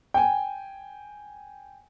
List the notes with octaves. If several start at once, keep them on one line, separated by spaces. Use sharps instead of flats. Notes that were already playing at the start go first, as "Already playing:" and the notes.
G5 G#5